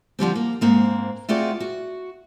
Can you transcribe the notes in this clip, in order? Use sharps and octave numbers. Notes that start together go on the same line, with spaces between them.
D3 F3 G3 C4
A#3
G#2 A#3 C4
A3 C4 F4 F#4 G#4 D5
F#4